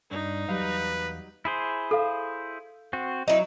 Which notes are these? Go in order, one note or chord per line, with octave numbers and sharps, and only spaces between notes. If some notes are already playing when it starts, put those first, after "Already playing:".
G2 D4 D#4
E2 F#3 G3 B4 F5
E4 G#4 C5
A4 F5
C4 F#4
F#3 D#4 E4